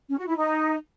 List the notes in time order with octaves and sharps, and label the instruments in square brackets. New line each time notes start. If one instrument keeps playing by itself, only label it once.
[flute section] C#4
F#4
E4
D#4